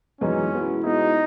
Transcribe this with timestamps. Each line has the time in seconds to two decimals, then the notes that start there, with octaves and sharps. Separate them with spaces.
0.21 F#2 E3 G#3 B3 C#4 D#4
0.52 B2 G#3 B3 E4
0.84 B2 G#3 B3 D#4 E4